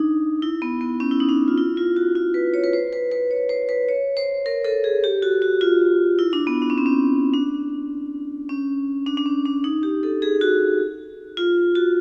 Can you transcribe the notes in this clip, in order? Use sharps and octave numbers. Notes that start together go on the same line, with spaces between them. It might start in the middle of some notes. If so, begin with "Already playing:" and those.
Already playing: D4 D#4
E4
B3
B3
C#4
E4
D#4
D4
F4
E4
F4
F#4
F4
B4
C#5
B4
C5
B4
B4
C#5
C5
B4
C#5
C5
A#4
A4
G#4
G4
F#4
F#4
F4
E4
D4
B3
D4
C#4
C4
C#4
D4
C#4
D4
D4
C#4
D4
D#4
G4
A4
G#4
F#4
F4
F#4